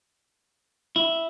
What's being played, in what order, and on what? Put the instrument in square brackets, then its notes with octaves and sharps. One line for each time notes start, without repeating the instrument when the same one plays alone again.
[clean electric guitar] E4